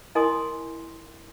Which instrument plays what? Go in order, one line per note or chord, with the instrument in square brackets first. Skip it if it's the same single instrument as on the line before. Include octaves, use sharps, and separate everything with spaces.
[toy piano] E4 A#4 D#5 G#5 C6 D#6